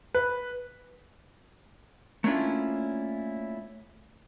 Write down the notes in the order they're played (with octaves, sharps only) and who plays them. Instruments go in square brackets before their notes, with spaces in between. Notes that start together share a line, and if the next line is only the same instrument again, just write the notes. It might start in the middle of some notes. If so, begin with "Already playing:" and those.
[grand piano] B4
[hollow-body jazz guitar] A3 A#3 C#4 D4 E4 F4